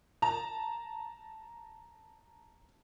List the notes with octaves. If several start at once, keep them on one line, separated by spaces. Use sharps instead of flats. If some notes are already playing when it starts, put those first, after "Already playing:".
A5 A#5